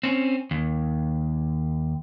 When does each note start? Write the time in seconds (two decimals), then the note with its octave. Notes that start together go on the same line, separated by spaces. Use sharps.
0.03 C4 C#4
0.51 D#2